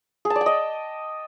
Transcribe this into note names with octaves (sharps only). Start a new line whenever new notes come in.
G#4
A5
D5
G5
D#5